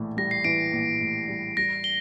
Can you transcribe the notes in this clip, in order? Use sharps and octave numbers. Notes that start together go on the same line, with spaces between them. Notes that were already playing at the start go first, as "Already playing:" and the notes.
Already playing: A#1 A2 E3
G3 A#6
C7
E3 D7
A#1
A2
G3
G3 A#6
G7